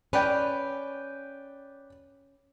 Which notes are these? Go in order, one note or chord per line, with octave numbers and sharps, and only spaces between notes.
C#4 B4 D5 G5